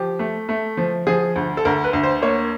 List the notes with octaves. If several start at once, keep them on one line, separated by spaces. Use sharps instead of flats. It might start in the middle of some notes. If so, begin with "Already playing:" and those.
Already playing: F3 G4
A3
A3
F3
F3 G#4
D2
A4
D2 A#4
B4
D2
C5
A#3 C#5